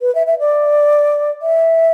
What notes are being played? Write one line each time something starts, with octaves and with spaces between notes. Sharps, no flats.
B4
E5
E5
D5
E5